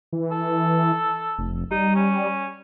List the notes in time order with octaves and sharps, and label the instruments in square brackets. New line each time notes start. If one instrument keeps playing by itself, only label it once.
[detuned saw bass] E3
[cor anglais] A4
[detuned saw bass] F1
[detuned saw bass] G3 [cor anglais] D#4
[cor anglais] C#4